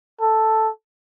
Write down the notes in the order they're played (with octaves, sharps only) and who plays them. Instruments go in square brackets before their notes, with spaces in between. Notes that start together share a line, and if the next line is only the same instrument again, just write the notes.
[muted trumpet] A4